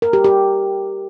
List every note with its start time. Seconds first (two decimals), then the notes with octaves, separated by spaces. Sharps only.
0.02 A#4
0.13 G4
0.24 G4